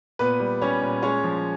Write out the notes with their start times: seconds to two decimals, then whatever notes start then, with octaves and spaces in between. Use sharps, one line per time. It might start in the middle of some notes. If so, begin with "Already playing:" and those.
0.19 A#2 B3 B4
0.40 G3
0.62 G3 C#4 C#5
0.82 A#2
1.02 G#3 C#4 C#5
1.24 F3